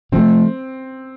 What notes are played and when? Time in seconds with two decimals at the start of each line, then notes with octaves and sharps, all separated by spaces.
0.12 C3 F3 A3 C4